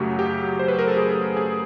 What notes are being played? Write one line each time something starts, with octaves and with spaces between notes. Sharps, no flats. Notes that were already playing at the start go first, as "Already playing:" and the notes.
Already playing: F#2 C#3 F#3 A3 F#4 G4
G4
C5
B4
A#4
A4
G#4
G#4